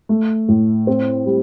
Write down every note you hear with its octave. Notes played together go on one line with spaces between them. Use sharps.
A3
A2
C4
G3